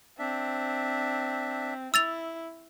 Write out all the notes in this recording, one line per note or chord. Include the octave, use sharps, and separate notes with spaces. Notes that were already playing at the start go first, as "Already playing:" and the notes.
C4 D4 E5
E4 E6 A6 F7